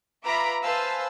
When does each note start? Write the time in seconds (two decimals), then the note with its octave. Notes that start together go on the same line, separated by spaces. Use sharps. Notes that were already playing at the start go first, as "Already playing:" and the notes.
0.25 F4 B4 E5 A#5 B5 D6
0.63 B4 C5 F5 G#5 A5 E6